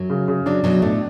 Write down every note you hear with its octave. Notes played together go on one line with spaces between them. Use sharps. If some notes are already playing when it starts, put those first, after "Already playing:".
Already playing: F#2 F#3
C#3
C#3
F#2 F#3 D4
F#2 B2 F#3
A2 A3 D4